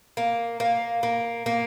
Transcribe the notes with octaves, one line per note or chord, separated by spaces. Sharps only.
A#3
A#3
A#3
A#3